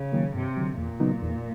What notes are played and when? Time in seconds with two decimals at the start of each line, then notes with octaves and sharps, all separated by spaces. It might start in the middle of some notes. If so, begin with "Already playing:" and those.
Already playing: C#3
0.13 D#3 F#3 A#3
0.34 G2 C3
0.57 D3 F#3
0.78 E2 A#2
1.00 C#3 F#3 B3 D#4
1.22 E2